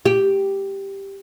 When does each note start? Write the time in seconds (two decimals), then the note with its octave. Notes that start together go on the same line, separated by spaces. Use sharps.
0.05 G4